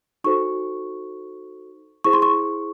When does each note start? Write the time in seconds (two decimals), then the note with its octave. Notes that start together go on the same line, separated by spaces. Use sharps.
0.24 D#4 F#4 A4 C5 C#6
2.04 E4 G#4 C5 C#6
2.13 C6
2.22 C#6